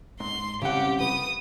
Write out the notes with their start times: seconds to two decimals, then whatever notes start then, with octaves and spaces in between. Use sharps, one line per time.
0.20 G#2 C6
0.62 C2 C#3 G4 F#5
1.00 B4 D#6